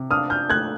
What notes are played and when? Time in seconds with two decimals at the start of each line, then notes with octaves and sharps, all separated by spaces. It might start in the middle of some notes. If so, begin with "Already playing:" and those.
Already playing: C3
0.10 D4 D#6 F6
0.30 F6 G6
0.49 A3 F#6 G#6